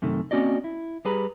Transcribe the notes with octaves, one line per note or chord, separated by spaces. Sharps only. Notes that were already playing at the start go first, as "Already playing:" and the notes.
F#2 C3 D#3 A3
A#3 C4 C#4 F#4 D5 D#5
E4
G3 G#4 B4 A#5 B5